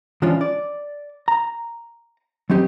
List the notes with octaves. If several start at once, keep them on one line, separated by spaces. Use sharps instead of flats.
E3 F3 G#3 C#4 D4 F4
D5
A#5
F#3 C4 D#4 G4